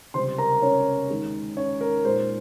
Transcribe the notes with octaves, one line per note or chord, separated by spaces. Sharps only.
C#2 C3 G3 C4 C5 C6
A#4 A#5
C#4 C#5
D#2 D#3 G#3 D#4
C#4 C#5
A#4
A#2 G#3 D#4 C5